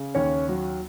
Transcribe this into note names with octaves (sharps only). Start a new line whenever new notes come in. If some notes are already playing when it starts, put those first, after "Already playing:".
Already playing: C#3
D#2 C#4 C#5
F#3